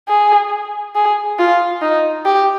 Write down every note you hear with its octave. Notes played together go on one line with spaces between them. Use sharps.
G#4
G#4
F4
D#4
G4